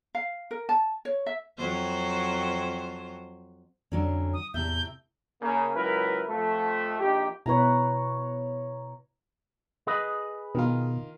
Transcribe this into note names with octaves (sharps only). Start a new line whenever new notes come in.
F5
A#4
A5
C#5
E5
F2 F#3 C5
F2 D3 F#3 C#4
D#6
E2 A2 C3 E5 G6
C#3 A#3
C#2 F#3 E4 A#4 B4
F2 F3 A3
A#1 D#4 G4
B2 E4 B4 C#5 A#5
G#4 B4 D#5
B2 D#3 F4